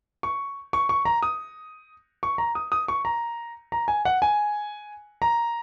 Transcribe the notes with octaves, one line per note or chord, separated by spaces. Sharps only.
C#6
C#6
C#6
A#5
D#6
C#6
A#5
D#6
D#6
C#6
A#5
A#5
G#5
F#5
G#5
A#5